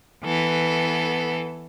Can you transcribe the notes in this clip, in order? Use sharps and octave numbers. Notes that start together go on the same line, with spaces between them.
E3 B3 A4